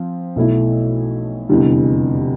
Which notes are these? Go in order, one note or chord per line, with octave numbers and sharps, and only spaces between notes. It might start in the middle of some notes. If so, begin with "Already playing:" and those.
Already playing: F3 C4
B1 B2 A3 E4
F1 E2 D3 G3